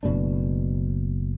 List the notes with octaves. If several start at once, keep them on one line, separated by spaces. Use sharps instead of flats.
F#1 B2 A3 D4